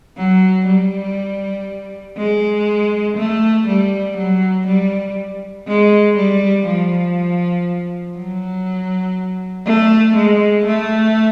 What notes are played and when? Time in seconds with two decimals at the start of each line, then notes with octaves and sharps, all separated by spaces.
0.17 F#3
0.67 G3
2.17 G#3
3.17 A3
3.67 G3
4.17 F#3
4.67 G3
5.67 G#3
6.17 G3
6.67 F3
8.17 F#3
9.66 A3
10.16 G#3
10.66 A3